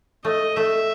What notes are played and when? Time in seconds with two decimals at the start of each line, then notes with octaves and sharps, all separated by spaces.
0.25 A3 D#5
0.57 A3 E5